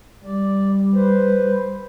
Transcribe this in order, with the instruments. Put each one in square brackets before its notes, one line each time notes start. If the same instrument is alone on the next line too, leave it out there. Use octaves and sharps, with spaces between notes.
[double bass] G3 [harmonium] D5
[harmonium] B4 C5